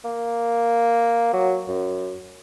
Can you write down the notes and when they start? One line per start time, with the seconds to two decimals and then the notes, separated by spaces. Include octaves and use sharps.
0.05 A#3
1.33 F#3
1.68 F#2